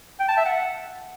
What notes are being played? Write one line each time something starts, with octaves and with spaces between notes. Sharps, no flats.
G5
A5
E5
F#5